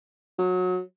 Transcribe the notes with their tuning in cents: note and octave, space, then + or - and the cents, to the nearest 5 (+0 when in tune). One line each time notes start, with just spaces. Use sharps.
F#3 -20